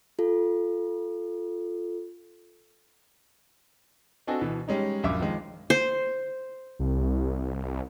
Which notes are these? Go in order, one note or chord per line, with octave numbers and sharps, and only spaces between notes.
F4 A4
C4 D4 F#4 A4 D#5 G#5
B2 E3
G3 G#3 C#4 D#4
A#1 F#2 E5 F5 D6
D#3 F3 G#3
C5
C2